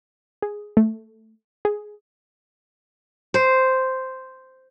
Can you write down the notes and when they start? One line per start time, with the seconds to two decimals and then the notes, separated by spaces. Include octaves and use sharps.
0.42 G#4
0.77 A3
1.65 G#4
3.34 C5